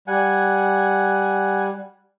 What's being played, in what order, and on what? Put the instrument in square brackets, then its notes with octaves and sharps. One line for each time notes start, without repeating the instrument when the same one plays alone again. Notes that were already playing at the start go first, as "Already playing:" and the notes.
[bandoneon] G3 [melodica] F#5 G#5